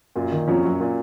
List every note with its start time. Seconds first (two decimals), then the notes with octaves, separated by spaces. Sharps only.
0.16 F#2 A#2 F#3
0.32 D#3
0.48 F2 F3 F#3 C#4
0.64 F#2 F#3
0.81 A#2